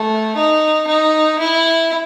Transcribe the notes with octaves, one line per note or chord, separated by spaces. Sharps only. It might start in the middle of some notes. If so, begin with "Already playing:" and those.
Already playing: A3
D#4
D#4
E4